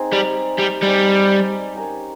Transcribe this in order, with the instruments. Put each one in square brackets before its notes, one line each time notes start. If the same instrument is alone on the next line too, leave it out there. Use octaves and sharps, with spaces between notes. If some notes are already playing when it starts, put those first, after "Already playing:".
Already playing: [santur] C4 D#4 G#4
[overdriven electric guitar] G3
G3
[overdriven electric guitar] G3 [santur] C4 D#4 G#4
[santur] C#4 G4 A#4